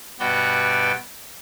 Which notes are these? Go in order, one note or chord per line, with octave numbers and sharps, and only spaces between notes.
G2 B2 B3 F#4 D5 G5